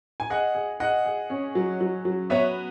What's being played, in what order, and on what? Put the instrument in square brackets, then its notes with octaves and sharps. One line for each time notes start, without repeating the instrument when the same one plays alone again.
[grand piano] G#5
[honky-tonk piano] G#4 [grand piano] D#5 F#5
[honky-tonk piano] G#4
[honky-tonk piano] G#4 [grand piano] D#5 F#5
[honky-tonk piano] G#4
C#4
F#3
F#3
F#3
[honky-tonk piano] B3 [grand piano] C#5 E5